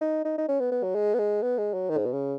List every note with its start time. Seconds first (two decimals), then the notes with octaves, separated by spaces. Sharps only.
0.01 D#4
0.25 D#4
0.38 D#4
0.48 C#4
0.60 B3
0.71 B3
0.83 F#3
0.95 G#3
1.14 B3
1.19 G#3
1.42 B3
1.58 G#3
1.74 F#3
1.89 D#3
1.98 G#2
2.05 B2
2.13 C#3